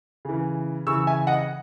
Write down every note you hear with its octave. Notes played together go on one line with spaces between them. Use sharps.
C#3 E3
C#3 E3 C#6 E6
E5 G#5
D#5 F#5